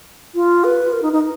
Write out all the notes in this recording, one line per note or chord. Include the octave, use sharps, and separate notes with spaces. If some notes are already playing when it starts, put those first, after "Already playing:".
F4
B4
A#4
D#4
D#4